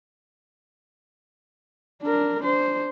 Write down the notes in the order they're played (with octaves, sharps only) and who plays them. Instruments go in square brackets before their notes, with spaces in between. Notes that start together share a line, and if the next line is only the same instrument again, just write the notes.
[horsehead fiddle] D4 A#4
D4 C5